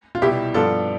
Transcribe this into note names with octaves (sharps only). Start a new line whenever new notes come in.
F4
C2 B2 G3 E4 G4
G2 F3 B3 D4 F4 A4